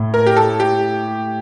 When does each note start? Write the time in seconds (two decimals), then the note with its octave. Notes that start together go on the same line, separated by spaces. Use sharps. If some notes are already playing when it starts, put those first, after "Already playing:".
Already playing: A2
0.14 A#4
0.27 G4
0.37 A4
0.60 G4